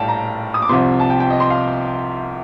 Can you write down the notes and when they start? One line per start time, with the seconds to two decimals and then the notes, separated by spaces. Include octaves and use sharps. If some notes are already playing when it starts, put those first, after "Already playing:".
Already playing: A#1 A2 G3 F5 G5 A5
0.08 A#5
0.54 D#6
0.62 D6
0.69 C2 C3 F3 C6
1.00 A5
1.10 G5
1.20 G5
1.30 D#5
1.40 C6
1.50 F5